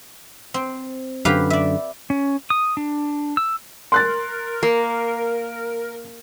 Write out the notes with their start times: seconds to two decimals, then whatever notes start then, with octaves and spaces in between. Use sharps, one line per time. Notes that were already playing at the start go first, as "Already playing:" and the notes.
0.54 C4
1.25 F#2 D3 G4 B4 F5
1.50 D5 E5
2.10 C#4
2.50 D#6
2.77 D4
3.37 E6
3.92 A#4 C6 F#6 A6
4.63 A#3